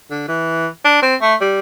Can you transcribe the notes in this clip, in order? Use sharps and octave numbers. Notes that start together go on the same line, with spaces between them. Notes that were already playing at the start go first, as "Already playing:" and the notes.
D3
E3
D4
C4
A3
G3